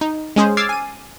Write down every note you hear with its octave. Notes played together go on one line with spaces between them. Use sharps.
D#4
G#3 C#4 G#4 C5
D6 E6 F6 G#6 A6 C7
G#5 D#7